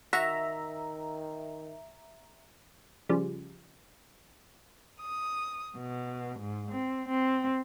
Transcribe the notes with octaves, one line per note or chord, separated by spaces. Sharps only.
D#3 F#4 E5 A#5
C#3 F3 G3
D#6
B2
G#2
C4
C4